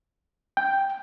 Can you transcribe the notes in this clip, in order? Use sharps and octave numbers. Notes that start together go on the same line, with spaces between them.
G5